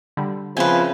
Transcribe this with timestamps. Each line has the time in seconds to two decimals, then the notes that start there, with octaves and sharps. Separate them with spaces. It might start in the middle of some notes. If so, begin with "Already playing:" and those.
0.17 D3 G3
0.57 C#3 F3 C4 B4 E5 G#5